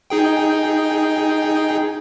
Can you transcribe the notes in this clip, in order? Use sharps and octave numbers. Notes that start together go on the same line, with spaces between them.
D#4 G#4 G5